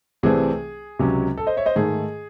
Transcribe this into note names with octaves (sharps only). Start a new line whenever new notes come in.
C2 C3 E3 A3 C4 G#4
C#2 C3 F#3 C#4
A4
C5 D#5
C#5 E5
C5 D#5
G#2 D#3 A3 G#4